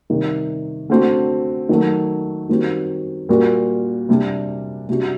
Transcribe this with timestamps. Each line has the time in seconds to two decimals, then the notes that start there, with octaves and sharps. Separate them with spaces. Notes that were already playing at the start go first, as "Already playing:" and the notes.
0.10 C3 D#3 G3
0.90 D3 A3 C4 F#4
1.69 D#3 F#3 A3
2.49 D#3 G3 C4 F#4
3.29 A#2 G3 A#3 F#4
4.09 C3 G3 D4
4.88 C3 G3 D4 F#4